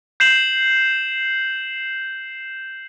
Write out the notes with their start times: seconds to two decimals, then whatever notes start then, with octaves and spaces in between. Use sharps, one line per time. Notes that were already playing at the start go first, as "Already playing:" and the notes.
0.20 G6 C7 E7 F#7